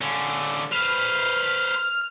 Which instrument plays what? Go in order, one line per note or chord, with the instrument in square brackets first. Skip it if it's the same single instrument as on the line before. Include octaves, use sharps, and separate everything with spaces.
[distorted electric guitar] D3 C#4
[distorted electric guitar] B4 C5 [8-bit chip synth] F6